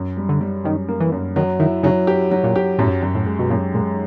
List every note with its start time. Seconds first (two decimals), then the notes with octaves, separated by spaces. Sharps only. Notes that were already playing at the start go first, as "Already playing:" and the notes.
Already playing: F#2
0.17 G3
0.29 D3
0.41 G3
0.64 F#2 D#3
0.88 A#3
1.00 E3
1.12 F#2
1.36 D#3 F#3
1.60 D#3 E4
1.83 C#3 F#3
2.07 G4
2.31 F#3
2.44 A#2
2.56 G4
2.79 F#2 A2
3.03 F#2
3.15 A2
3.26 G#3
3.39 B2
3.50 F#2 A#2
3.74 A#2 G#3